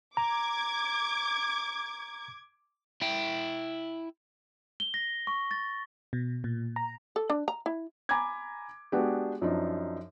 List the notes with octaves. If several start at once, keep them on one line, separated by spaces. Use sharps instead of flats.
A#5 D6 G#6
E4 G5
G7
A#6
C#6
A6
B2
A#2
A#5
A4
D4
A#5
E4
G#5 A#5 B5 D6 G#6
G#3 B3 D4 F#4 G4
F#2 F3 D4 D#4